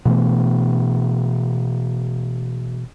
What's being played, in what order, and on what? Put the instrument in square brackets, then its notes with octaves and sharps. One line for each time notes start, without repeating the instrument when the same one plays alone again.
[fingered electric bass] B2 E3 A3 B3